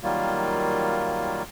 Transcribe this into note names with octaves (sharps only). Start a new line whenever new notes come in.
D#3 F#3 G3 A#3 F4